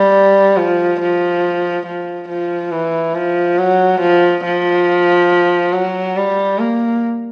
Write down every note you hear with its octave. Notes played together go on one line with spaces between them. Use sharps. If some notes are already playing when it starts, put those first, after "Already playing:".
Already playing: G3
F3
F3
F3
F3
E3
F3
F#3
F3
F3
F#3
G3
A#3